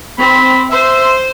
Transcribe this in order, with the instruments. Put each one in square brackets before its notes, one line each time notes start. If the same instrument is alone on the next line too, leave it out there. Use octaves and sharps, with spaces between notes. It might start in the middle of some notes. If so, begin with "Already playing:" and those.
[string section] C4 [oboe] B5
[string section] C5 [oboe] E5